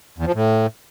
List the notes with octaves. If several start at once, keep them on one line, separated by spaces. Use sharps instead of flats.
E2
F3
A2